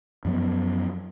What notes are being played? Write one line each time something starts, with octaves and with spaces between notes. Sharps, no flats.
F#2 F3 F#3 B3